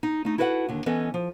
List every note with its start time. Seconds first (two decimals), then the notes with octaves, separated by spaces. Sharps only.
0.03 D#4
0.25 A3 D#4
0.38 E4 F#4 A4 B4 C#5 F#5
0.69 D#2 D3
0.86 E3 B3 C#4 A4 D#5
1.14 F3